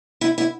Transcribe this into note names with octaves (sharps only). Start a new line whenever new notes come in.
E4
E4